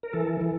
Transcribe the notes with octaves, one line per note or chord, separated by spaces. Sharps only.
A#4
E3 A4
E3